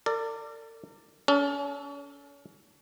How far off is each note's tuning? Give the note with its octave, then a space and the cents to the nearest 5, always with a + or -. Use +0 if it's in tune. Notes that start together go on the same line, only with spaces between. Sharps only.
A#4 -45 D5 +0
C#4 +35 A4 +0